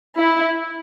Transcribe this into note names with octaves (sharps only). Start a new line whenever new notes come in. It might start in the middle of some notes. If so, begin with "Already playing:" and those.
E4